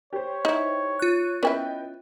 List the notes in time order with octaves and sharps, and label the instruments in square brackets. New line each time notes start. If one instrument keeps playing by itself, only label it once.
[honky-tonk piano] G4 C5 [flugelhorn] C#5
[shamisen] D#4 E4
[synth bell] F4 F#6
[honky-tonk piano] B3 D#5 G5 [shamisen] C#4 E4 B4